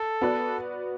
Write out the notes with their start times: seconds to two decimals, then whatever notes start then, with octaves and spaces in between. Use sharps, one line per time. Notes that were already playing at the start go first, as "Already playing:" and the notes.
Already playing: A4
0.21 B3 F#4 B4 D5